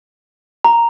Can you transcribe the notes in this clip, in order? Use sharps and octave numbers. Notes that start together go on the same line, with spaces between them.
A#5